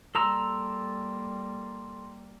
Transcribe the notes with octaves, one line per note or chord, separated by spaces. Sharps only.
G3 A#3 A4 A#5 C6 E6